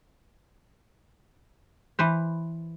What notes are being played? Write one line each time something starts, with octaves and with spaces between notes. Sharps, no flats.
E3 B4 C5